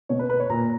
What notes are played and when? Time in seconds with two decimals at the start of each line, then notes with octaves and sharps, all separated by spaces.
0.09 B2 C#5
0.19 B4
0.30 B4
0.40 C#5
0.50 A#2 A#5